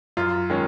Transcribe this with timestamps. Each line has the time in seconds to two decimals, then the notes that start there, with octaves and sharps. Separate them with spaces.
0.17 F#2 F4
0.50 D#3 G#3 C#4